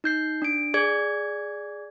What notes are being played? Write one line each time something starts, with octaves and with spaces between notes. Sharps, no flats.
D#4 G6 C7
D4 D7
G#4 D5 G#6